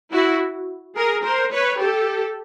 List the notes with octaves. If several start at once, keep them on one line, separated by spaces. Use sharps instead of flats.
E4 F#4
G#4 A#4
A#4 C5
B4 C#5
G4 A4